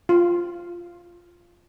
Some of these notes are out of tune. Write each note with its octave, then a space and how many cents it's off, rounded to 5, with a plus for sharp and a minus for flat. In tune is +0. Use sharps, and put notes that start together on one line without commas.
F4 -5